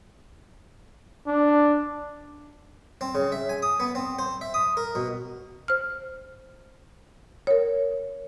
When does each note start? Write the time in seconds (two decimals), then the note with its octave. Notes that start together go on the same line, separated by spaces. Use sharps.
1.27 D4
3.01 C4
3.15 C#3
3.32 E5
3.49 G#5
3.62 D#6
3.80 B3
3.95 C4
4.19 C5
4.41 E5
4.54 D#6
4.77 A#4
4.95 B2
5.68 C5 F6
7.47 A#4 C#5